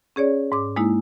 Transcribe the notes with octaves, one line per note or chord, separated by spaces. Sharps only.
C#4 G#4 C#5 D5
G#2 D6
G#3 A#3 D#4 E4